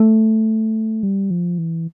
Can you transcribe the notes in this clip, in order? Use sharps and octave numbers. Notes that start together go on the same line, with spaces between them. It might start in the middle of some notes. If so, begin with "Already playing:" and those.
Already playing: A3
G3
F3
E3